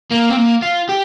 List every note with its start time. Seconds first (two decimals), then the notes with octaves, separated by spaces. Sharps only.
0.12 A#3
0.30 C4
0.37 A#3
0.62 F4
0.89 G4